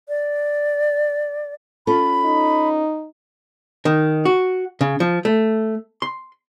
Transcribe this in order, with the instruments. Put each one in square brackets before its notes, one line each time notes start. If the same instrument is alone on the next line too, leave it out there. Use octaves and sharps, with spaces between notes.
[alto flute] D5
[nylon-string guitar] C#4 F4 A4 [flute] B5
[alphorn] D#4
[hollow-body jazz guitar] D#3
F#4
C#3
F3
A3
C6